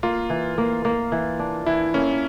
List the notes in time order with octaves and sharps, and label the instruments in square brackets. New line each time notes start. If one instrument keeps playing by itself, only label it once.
[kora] A#3 [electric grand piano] F4
[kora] E3
A#3
A#3
E3
D4
[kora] E3 [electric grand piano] E4
[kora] A#3 [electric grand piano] C#4